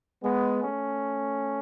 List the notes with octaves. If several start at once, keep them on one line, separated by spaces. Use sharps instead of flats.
G#3 B3
A3 C#4